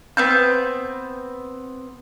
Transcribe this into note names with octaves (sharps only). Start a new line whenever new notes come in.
B3 C4 G6